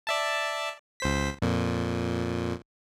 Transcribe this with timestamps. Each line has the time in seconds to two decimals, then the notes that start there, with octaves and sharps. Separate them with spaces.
0.07 D5 E5 A5
1.00 C#2 C5 B6
1.42 F2 A#2